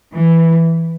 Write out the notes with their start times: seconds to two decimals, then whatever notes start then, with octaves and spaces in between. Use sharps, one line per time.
0.14 E3